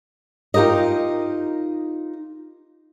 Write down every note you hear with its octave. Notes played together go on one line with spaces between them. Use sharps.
D#4 F4 G4 A#4 D#5